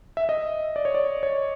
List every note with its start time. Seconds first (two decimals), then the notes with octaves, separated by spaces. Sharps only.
0.17 E5
0.29 D#5
0.76 D5
0.85 C#5
0.94 D5
1.23 C#5